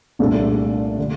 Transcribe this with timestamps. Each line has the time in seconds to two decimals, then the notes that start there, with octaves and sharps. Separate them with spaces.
0.19 C2 A#2 A3 D4
0.99 D3